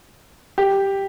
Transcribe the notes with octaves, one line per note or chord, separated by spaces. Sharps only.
G4